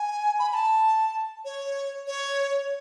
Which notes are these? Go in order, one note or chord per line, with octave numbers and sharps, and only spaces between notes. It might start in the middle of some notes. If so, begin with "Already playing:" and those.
Already playing: G#5
B5
B5
A5
C#5
C#5